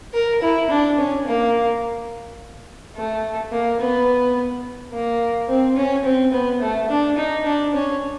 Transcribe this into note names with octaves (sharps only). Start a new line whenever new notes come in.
A#4
E4
D4
C#4
A#3
A3
A#3
B3
A#3
C4
C#4
C4
B3
A3
D4
D#4
D4
C#4